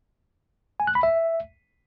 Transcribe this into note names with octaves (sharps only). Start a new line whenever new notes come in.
G#5
F#6
B5
E5